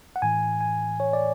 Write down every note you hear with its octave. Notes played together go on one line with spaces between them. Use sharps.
F#5
A2 E3 G#5
G#5
C#5
D5